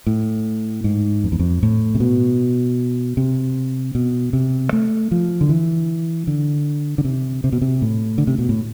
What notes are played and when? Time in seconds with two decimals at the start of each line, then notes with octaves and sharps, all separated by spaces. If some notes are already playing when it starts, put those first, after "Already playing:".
0.07 A2
0.84 G#2
1.24 F2
1.32 E2
1.39 F2
1.63 A2
1.95 C3
2.00 B2
3.17 C3
3.95 B2
4.33 C3
4.73 A3
5.11 F3
5.41 D3
5.49 E3
6.27 D3
6.98 D3
7.05 C3
7.44 C3
7.52 B2
7.62 C3
7.82 A2
8.18 D3
8.27 C3
8.39 B2
8.49 A2